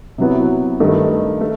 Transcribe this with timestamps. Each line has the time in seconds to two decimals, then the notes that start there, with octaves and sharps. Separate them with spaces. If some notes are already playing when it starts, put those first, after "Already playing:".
0.18 C3 F#3 B3 E4
0.80 G2 D#3 A3
1.41 A3